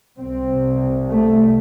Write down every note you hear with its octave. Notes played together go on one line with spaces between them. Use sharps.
C2 C3 C4
A3